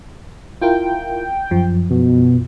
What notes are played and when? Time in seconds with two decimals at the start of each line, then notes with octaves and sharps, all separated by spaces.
0.62 E4 F4 A#4 G5
1.51 F#2 F3
1.90 B2